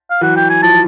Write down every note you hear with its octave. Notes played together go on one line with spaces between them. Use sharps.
F5
E3 F#3 F#5
G5
G#5
F3 A5